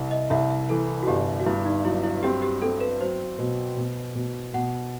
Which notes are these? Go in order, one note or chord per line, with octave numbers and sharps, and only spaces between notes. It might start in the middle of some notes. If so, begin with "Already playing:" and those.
Already playing: C2
D#5
C2 E5
E5
E3 A4
F#4
G1 G4
F#4
G2 E4
D#4
F#3 E4
E4
C4 G4
G4
C4 A4
B4
F#3 C5
B2
B2
B2
B2 F#5